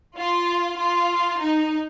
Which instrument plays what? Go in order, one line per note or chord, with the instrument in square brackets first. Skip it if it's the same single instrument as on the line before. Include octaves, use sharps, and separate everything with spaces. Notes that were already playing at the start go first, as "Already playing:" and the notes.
[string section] F4
F4
D#4